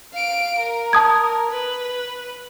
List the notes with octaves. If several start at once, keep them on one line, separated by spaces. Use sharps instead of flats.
F5 D7
A#4
A5 D#6 G#6
B4